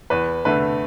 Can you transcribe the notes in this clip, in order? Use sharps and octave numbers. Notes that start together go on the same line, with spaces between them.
E2 B4
D3 A3 B4